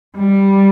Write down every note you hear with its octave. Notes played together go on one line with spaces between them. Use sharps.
G3